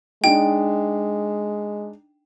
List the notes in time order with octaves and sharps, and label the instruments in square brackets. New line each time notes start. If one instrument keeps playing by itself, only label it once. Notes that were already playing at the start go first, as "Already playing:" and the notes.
[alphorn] G#3 [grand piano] D4 D#4 [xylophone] G5